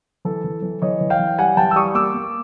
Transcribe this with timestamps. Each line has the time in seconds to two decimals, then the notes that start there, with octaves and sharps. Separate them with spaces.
0.25 E3 A4
0.44 E3
0.63 E3
0.82 E3 C#5 D#5
1.01 E3
1.10 F5 G5
1.19 E3
1.39 G3 F#5 G#5
1.57 E3 G5 A5
1.71 E6
1.76 G3 C#6 D#6
1.94 A#3 D6 E6
2.14 A#3